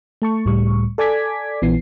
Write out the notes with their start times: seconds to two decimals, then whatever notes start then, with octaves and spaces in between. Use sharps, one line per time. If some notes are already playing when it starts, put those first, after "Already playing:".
0.22 A3 A5 C#6
0.45 C#2 A2 G3 C#6
0.98 A4 D5 G#5 D6 G#6 B6
1.62 A#1 E3 B3 C7